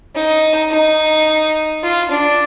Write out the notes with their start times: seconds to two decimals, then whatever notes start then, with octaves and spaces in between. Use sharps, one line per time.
0.15 D#4
0.71 D#4
1.83 F4
2.11 D4